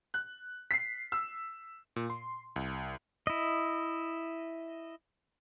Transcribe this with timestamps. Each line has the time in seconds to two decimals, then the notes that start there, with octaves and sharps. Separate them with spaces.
0.14 F#6
0.71 B6 C7
1.12 E6
1.96 A#2
2.10 C6
2.56 C2
3.27 E4 D#5